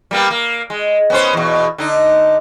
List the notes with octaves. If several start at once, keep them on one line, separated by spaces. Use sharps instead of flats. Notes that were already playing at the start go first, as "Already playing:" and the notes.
G3 A#3 B3
A#3
G#3
B3 C#4 C5
E2 B2
D3 D#4